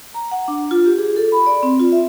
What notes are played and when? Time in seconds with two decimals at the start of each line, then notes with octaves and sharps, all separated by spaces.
0.14 A#5
0.31 F#5
0.48 D4
0.71 F4
0.86 G4
0.98 G#4
1.16 A4
1.32 B5
1.46 D5
1.63 C4
1.79 F4
1.92 E5